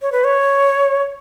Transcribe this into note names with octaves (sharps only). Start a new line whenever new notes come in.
C#5
B4
C#5